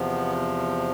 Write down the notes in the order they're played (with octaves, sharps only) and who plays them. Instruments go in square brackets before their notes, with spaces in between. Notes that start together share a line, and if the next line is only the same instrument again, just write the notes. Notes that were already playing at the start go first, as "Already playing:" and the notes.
Already playing: [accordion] E2 C3 F3 B3